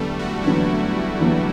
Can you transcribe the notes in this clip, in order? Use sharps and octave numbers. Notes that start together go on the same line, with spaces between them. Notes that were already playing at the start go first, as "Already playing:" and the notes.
Already playing: E2 D3 F#3 G3 A3 B3
F#4
E2 D3 F#3 B3 E4
E2 D3 F#3 B3